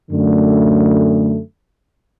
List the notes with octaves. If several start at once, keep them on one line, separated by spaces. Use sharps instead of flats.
F#2 D3 A3